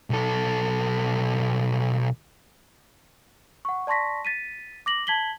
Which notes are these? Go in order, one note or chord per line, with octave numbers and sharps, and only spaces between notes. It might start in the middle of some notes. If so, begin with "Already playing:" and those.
B1 A4
F#5 C#6
D5 A5 C6 C#6 A#6 B6
A6 B6 D#7
D6 A#6 F#7
A5 G#6 B6 F#7 G7